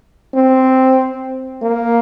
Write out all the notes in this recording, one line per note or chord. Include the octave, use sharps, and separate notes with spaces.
C4
A#3